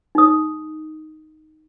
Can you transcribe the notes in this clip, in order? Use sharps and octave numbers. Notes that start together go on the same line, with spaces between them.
D#4 D#6